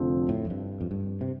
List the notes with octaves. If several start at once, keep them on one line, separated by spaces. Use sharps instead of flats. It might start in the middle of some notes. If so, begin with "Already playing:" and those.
Already playing: F1 F2 D3 F3 C4
A2
F2
G2
F2
G2
C3